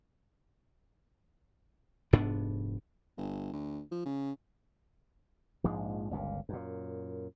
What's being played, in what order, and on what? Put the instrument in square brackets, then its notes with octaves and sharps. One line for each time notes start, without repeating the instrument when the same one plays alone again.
[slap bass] F1 G#2 B3 D4
[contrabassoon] G1
D2
F3
C#3
[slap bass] A#1 G#2 F3 G#3
G1 C#2 A#2
F#2 A#2